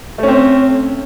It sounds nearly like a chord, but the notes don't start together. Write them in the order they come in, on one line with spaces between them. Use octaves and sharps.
A3 C#4 C4